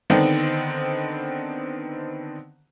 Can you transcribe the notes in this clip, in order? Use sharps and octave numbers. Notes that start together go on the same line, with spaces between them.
D3 D#3 B3 C4 D4 D#4